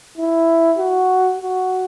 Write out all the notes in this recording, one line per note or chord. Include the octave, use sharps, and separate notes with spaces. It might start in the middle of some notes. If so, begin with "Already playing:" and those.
E4
F#4
F#4